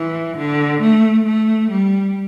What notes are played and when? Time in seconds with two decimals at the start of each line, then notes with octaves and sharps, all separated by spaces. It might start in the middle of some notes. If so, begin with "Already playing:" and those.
Already playing: E3
0.37 D3
0.82 A3
1.25 A3
1.70 G3